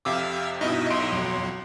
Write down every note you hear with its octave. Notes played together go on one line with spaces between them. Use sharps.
F2 C3 E5 F5 D6 E6
G2 B2 D#4 E4 D#5 E5
B1 C6 D7
F2 F#3